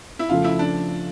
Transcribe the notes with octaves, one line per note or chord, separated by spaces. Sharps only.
E4
C#3 F3 A3 F4
E4
D4